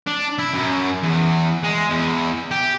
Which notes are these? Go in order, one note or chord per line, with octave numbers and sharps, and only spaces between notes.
D4
E4
F#2
E2
G#3
E2
G4